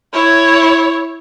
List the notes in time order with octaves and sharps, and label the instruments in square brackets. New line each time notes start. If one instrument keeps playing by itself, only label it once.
[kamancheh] E4 C#5